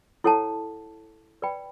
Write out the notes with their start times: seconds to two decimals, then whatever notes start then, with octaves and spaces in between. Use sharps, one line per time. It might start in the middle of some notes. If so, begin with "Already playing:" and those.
0.24 E4 A4 C#5 F#5 A5
1.42 B4 D5 G5 B5